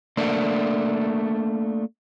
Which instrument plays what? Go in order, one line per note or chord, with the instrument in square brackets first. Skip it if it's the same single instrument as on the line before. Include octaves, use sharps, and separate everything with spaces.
[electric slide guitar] A3 A#3 D4